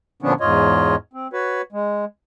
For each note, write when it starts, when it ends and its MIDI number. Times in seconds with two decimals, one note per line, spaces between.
0.22 0.33 46
0.22 0.33 50
0.22 0.33 53
0.22 0.33 59
0.22 0.33 61
0.22 0.33 62
0.41 0.95 40
0.41 0.95 44
0.41 0.95 65
0.41 0.95 73
0.41 0.95 75
1.13 1.27 60
1.33 1.62 66
1.33 1.62 71
1.33 1.62 73
1.72 2.05 56